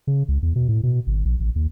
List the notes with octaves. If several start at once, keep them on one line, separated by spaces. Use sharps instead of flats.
C#3
C#2
E2
B2
A2
B2
G#1
A#1
A1
D#2